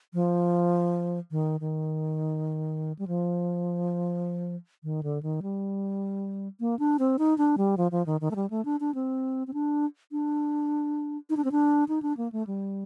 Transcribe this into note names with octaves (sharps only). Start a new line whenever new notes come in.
F3
D#3
D#3
G3
F3
D#3
D3
D#3
G3
A#3
D4
C4
D#4
D4
G3
F3
F3
D#3
D#3
A3
G3
A3
D4
D4
C4
C4
D4
D4
D#4
D4
C4
D4
D#4
D4
A#3
A3
G3